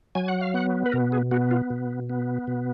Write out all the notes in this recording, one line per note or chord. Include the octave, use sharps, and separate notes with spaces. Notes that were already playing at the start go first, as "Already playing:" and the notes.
F#3 G#5
F#5
F5
B3 F#5
B4
B2 A#4
G#4
B3 F#4
F4
B2
B3
B2